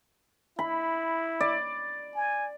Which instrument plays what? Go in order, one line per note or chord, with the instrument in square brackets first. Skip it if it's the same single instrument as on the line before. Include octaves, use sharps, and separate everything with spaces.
[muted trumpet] E4 [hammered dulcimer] B5
[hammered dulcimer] D5
[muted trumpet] G#5